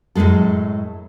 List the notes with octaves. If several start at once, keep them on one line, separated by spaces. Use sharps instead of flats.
F#2 A2 C#3 G#3 A4